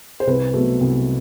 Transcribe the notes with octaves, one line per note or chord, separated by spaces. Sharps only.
C5
C2 B4
B2 F#3 A3
C2